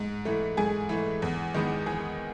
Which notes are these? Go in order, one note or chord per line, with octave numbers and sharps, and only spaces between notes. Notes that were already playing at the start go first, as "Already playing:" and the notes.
Already playing: G#2
E3 A3
G#2 G#4
E3 A3
E2
D#3 G#3 B3
E2 G#4